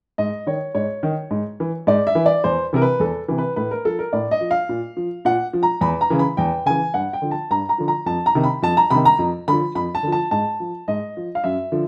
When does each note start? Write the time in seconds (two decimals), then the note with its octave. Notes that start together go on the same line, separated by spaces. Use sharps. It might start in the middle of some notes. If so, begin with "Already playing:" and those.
0.18 G#2 D#5
0.47 D#3 C#5
0.75 G#2 C#5
1.03 D#3
1.31 G#2
1.60 E3
1.87 G#2 D5
2.07 E5
2.15 E3
2.26 D5
2.44 E2 C5
2.73 C3 E3 A#4
2.82 B4
3.00 E2 A4
3.28 C3 E3
3.38 B4
3.56 A2 B4
3.71 A#4
3.85 F3 A4
3.99 A#4
4.13 A2 D5
4.31 D#5
4.41 F3
4.51 F5
4.69 A#2
4.97 F3
5.25 A#2 F#5
5.53 F3
5.63 A#5
5.81 E2 B5
6.01 A#5
6.10 C#3 E3
6.19 B5
6.37 E2 G5
6.66 C#3 E3 G#5
6.94 G2 F#5
7.13 G5
7.22 D3 F3
7.31 A5
7.51 G2 A#5
7.69 A#5
7.78 D3 F3
7.88 A#5
8.06 F2 A5
8.26 A#5
8.35 C3 D#3
8.44 B5
8.62 F2 A5
8.77 A#5
8.90 C3 D#3 B5
9.05 A#5
9.19 F2
9.48 D3 F3 B5
9.75 F2 B5
9.95 A5
10.03 D3 F3
10.12 A5
10.31 G#2 A5
10.60 F3
10.88 G#2 D#5
11.17 F3
11.35 F5
11.44 F#2 E5
11.72 D3 F3